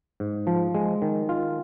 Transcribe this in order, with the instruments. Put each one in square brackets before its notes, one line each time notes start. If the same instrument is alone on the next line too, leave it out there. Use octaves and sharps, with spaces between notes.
[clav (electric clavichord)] G#2
F3
G#3
D#3
F4